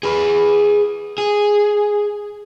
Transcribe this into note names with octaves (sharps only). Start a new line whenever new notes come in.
G#4 B4
G#4